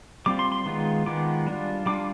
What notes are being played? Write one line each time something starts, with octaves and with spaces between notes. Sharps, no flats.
G3 C4 F4 D6
C6
C6
D#3 G#3 B3 F4
D#3 G#3 B3 F4 D6
G3 D4 F4
G3 D4 F4 D6